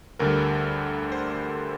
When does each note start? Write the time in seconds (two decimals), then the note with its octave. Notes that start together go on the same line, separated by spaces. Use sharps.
0.19 D2 D3 G3 A#4
1.12 C5